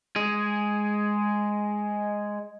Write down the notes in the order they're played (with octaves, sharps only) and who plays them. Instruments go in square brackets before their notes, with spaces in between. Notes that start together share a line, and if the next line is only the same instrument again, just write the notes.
[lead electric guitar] G#3 G#4